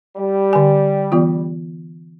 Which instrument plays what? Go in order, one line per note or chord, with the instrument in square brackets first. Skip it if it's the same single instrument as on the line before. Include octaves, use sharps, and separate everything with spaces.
[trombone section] G3
[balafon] D3 G#5
E3 B3 F4